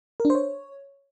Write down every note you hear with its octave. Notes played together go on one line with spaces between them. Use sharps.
A#4
D4
C5
C#5